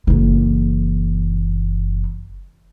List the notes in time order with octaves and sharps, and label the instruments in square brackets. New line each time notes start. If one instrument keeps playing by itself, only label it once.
[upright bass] F#1 E3